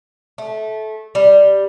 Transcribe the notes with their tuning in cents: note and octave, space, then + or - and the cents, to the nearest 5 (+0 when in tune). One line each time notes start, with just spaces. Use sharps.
A3 -20
G3 +0